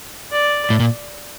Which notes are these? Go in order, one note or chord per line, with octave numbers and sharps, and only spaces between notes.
D5
A2
A#2